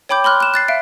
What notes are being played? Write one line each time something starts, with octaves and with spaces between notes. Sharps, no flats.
C#5 G5 B5 D6 G6
B5 C6 F6 F#6
F#6 E7
F#6 A6 C7
E5 F5 D7